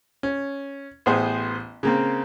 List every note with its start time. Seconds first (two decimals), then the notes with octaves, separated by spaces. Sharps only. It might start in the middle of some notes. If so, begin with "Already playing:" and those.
0.23 C#4
1.06 A1 B3 G#4 C5
1.83 C#3 A#3 C4